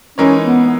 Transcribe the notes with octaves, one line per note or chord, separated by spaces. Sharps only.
E3 G#3 C#4 D#4 A#4 C#5
B3
B3